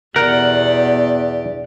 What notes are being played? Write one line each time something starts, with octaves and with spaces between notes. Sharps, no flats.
E2 B2 G4 A#4 D5 F#5